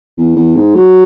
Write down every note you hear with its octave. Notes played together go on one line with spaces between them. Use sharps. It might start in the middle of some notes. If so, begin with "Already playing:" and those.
E2
E2
G#2
F#3